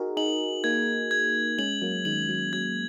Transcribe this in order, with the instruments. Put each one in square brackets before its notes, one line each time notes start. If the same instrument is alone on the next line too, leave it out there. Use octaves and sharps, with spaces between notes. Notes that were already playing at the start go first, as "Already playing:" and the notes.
Already playing: [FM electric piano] D#4 F#4 G#4 A#4
[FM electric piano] D#4 G#4 [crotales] F#7
[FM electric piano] A#3 D#4 [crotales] G#6
[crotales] G#6
[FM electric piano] G#3 C#4 [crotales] F#7
[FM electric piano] F#3 A#3
[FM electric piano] D#3 G#3 [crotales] F#7
[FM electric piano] F#3
[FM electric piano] F#3 [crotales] G#6